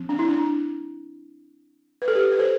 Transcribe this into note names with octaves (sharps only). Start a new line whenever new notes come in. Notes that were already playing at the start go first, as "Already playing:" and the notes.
Already playing: F3 C4
D4
E4
D4
B4
A4
G4 B4
B4
A4 C5